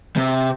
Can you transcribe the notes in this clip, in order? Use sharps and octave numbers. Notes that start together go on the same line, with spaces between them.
C3